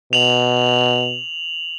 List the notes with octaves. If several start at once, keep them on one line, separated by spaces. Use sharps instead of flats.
B2 F7 F#7